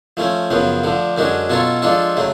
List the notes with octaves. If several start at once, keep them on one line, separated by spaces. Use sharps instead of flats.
F3 A3 C#4
F#2 C#3 F3 B3
D2 D3 F3
F#2 D3 G#3 C#4 F#4
B2 F#3 C#4 F4 A4
F3 G#3 D4 F4 A4
C#3 F#3 A3